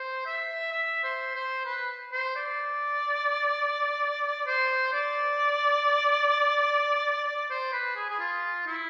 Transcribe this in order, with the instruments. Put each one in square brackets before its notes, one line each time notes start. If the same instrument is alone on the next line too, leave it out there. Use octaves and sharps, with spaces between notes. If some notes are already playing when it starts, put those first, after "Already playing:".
Already playing: [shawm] C5
E5
E5
C5
C5
B4
C5
D5
C5
D5
D5
C5
B4
G#4
G#4
F4
E4